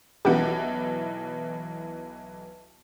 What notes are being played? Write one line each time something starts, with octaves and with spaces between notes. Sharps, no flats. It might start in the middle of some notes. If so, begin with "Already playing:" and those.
B1 E3 G4 A#4 F#5